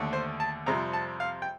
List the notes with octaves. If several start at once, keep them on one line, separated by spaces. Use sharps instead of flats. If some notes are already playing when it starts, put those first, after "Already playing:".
Already playing: D#2 D3 A3
C5
A5
F2 C3 G3 A#5
A5
F5
G5